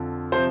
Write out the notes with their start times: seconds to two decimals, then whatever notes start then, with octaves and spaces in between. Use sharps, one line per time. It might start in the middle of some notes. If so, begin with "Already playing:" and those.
Already playing: F2 D3 F3
0.32 C3 F3 C5